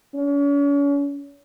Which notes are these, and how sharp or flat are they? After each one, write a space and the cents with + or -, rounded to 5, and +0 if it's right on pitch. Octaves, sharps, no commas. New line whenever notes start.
C#4 +40